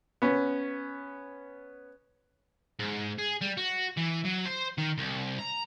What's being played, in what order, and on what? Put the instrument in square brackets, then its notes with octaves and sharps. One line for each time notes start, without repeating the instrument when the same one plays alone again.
[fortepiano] B3 C#4
[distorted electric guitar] G#2
G#4
G3
F#4
E3
F#3
C5
D#3
C2
A#5